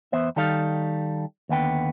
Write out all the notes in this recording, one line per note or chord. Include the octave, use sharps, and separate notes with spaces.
E2 B3 C5 E5
D#3 G3 D#4 A4 F5
D#2 D3 B3 G5